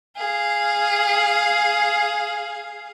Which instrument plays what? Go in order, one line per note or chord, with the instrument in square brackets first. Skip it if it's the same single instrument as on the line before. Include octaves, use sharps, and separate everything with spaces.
[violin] G#4 F5